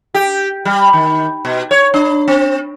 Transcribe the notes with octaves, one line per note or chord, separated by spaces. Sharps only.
G4
G3
D#3
B2
C#5
D4
C4